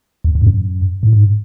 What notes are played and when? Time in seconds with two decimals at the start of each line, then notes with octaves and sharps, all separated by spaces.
0.24 E2
0.35 E2
0.41 G#2
0.47 F#2
1.03 A2
1.13 G#2